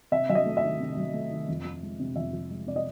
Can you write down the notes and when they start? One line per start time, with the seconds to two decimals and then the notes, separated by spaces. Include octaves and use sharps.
0.12 C3 E5
0.29 F#3 E5
0.35 D#5
0.46 A3
0.57 E5
0.63 D#3
0.80 C3
0.97 F#3
1.14 A3
1.31 D#3
1.48 F2
1.65 F3
1.83 G#3
2.00 C3
2.16 F2 E5
2.33 F3
2.51 G#3
2.67 C3 D5
2.76 D#5